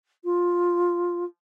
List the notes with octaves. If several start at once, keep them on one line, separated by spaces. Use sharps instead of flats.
F4